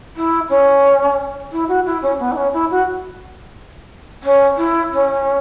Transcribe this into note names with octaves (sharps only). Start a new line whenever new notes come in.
E4
C#4
E4
F#4
E4
C#4
B3
E4
C#4
E4
F#4
C#4
E4
C#4